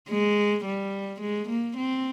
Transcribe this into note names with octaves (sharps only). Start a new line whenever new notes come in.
G#3
G3
G#3
A#3
C4